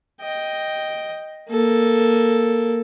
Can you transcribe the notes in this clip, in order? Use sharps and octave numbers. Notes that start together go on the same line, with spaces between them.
D#5 G5
A#3 A4